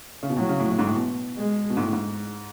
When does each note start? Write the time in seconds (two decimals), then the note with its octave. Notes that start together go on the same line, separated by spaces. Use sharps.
0.23 C#3
0.30 B2
0.37 A2 F#3
0.49 C#3
0.59 A2
0.71 A2
0.79 G#2
0.87 A2
0.96 B2
1.37 G#3
1.70 B2
1.77 G#2
1.81 A2
1.93 G#2